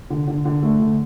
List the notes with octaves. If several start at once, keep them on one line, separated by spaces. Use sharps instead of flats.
D3
D3
D3
A3
D3